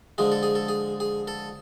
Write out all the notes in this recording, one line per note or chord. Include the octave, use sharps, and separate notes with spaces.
D3 F3 G#3 G#4
A4
G#4
A4
G#4
G#4
A4